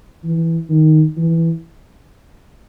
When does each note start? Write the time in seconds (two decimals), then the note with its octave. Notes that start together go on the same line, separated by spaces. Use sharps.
0.24 E3
0.69 D#3
1.17 E3